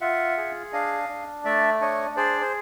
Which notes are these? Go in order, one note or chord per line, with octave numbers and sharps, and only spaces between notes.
F4 E5 F#5
G#4
D4 D#5 F5
D4
A3 D5 E5
D4 C#5 D#5
G#4 C5 D5
C5